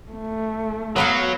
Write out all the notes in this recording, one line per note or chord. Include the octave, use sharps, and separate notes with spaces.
A3
F#3 B3 B4 F5